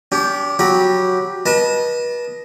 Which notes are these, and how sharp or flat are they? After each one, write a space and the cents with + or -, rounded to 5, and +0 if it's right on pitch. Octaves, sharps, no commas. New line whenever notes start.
D4 -40 G4 +0
F#3 +0 G4 +0 B5 -30
B4 -35 D#5 +0 A5 -15